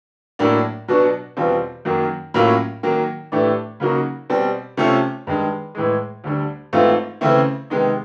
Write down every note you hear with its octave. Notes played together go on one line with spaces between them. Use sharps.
A2 F#3 A#3 D4
B2 F#3 B3 D4 F#4
E2 B2 G3 C4 F4
F#2 D#3 F#3 A#3
A2 F#3 A#3 C#4 F4
D#3 F#3 A#3
A2 E3 A3 D4 G4
C#3 F#3 A#3 D#4 F#4
B2 G3 C4
C3 F3 A3 C#4
G2 D#3 G#3
A2 E3 G#3
D2 D3 G3
G#2 E3 A3 C4 F4
C#3 E3 A3 C4 E4
C3 D#3 G#3 B3 D#4